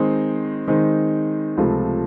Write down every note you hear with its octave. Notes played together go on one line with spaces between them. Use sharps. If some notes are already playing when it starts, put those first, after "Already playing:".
Already playing: D#3 G#3 C4 D#4
D#3 G#3 C4 D#4
C#2 C3 F3 A3